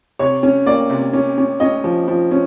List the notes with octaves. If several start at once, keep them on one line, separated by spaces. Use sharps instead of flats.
C3 C#5
C#4
A#3 D5
C3
C#4
C#4
C#4 D#5
F3
F3
C#4